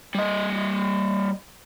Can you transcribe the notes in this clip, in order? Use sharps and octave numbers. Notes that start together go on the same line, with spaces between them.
G3 D#5